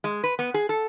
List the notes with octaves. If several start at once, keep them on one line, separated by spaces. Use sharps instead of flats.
G#3
B4
B3
G#4
A4